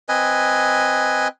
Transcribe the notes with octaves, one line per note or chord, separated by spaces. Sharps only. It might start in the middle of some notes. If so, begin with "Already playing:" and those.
C4 B4 D#5 G#5